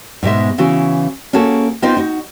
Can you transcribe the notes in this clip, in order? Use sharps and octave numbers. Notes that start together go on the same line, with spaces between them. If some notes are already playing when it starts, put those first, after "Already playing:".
G#2 B2 G#3 E5
C#3 E3 F#4
A#3 C#4 F#4 G#4 A4
B3 C4 D#4 F4 C5
D#4 F#4